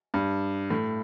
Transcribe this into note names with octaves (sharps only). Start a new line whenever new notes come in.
G2
A2